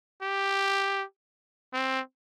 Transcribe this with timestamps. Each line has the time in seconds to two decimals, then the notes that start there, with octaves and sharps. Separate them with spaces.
0.22 G4
1.73 C4